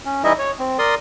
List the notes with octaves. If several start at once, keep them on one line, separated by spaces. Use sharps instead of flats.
C#4
E3 G3 D#4 E4 D#5 E5
C#5
C4
A#4 D5 C6 D#6